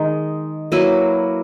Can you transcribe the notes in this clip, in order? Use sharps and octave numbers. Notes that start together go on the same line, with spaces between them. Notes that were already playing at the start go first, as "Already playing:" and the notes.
Already playing: D#3 G#3 D#4
F#3 A#3 E4 B4